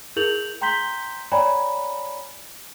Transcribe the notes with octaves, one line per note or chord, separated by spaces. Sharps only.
E4 G#4 A#4 G6 F7 F#7
G5 A#5 C6 G6 B6 G7
C#5 D5 G5 G#5 A#5 B5